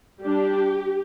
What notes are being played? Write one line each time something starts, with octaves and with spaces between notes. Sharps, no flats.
G3 D4 G4